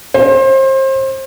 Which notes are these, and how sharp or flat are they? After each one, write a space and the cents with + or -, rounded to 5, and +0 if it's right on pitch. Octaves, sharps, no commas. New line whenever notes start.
C5 +30